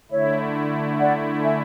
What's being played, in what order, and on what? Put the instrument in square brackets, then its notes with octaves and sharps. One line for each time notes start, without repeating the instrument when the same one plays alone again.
[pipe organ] D3 A3 E4 [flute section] C#5 E5
[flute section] D5 F#5
E5 G#5